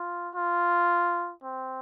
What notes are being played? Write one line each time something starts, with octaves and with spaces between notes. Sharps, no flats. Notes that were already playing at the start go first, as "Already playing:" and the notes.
Already playing: F4
F4
C4